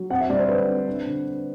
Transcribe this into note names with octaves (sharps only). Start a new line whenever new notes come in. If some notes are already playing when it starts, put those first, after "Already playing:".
Already playing: F#3
C4 F#5
E5
G3 D5
C5
D3 B4
C4
D4
D3